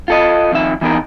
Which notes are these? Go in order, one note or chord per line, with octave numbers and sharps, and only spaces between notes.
F4 A4 D#5
F2 D#3 E5
E3 B3 D#4 A#4